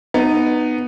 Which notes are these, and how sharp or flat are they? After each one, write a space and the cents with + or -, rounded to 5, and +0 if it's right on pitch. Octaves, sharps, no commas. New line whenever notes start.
B3 +0 D#4 -15